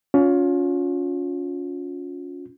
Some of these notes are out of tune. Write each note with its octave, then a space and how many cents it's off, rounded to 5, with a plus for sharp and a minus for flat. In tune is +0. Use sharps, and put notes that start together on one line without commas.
C#4 +25 F4 +35